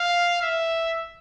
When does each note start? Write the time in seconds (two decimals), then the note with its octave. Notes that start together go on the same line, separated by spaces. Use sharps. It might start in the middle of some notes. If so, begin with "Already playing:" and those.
Already playing: F5
0.42 E5